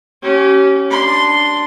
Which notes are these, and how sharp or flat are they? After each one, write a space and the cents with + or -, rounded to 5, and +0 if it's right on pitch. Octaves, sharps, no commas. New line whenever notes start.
C#4 +0 G4 -35
D4 +0 C6 -10